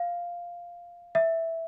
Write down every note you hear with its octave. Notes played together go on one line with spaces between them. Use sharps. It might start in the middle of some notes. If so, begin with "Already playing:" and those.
Already playing: F5
E5